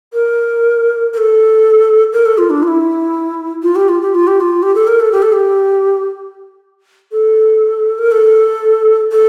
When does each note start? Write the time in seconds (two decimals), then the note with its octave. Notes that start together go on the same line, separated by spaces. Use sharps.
0.13 A#4
1.13 A#4
1.17 A4
2.13 A#4
2.25 A4
2.38 F4
2.50 D4
2.63 F4
2.68 E4
3.63 F4
3.76 G4
3.89 F4
4.01 G4
4.15 F4
4.27 G4
4.40 F4
4.63 G4
4.75 A4
4.87 A#4
5.00 A4
5.12 G4
5.22 A4
5.32 G4
7.12 A4
7.98 A#4
8.11 A4
9.12 A4